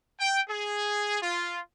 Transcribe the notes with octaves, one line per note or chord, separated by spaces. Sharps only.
G5
G#4
F4